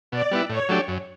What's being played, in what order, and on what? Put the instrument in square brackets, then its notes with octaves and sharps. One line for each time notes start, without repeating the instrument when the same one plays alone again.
[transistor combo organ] B2 [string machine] D5
[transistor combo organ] G3 B3 E4
[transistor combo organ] A2 [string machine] C#5
[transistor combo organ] F#3 A3 D4 G4
F#2